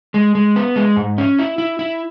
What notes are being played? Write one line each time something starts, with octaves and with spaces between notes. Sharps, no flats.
G#3
G#3
B3
G#3
G#2
C#4
E4
E4
E4